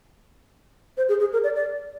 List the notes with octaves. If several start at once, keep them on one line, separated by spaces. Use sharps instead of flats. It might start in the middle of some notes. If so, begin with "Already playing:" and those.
C5
G#4
G#4
A#4
D5
D5